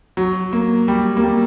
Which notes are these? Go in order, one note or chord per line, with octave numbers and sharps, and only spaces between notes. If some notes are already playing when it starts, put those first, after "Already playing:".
F#3
A#3
G3
A#3
G3